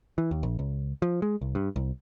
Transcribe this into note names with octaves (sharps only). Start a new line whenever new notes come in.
E3
D#2
A#1
C#2
F3
G#3
C2
G2
C2